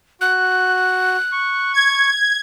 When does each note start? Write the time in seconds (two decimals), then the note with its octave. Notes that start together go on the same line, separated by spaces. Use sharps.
0.21 F#4 F#6
1.32 C#6
1.74 G#6